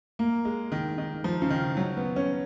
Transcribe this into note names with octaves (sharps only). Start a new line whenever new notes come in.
A#3
G#3
D#3
D#3
F3
C#3
D#3
F#3
B3
C#4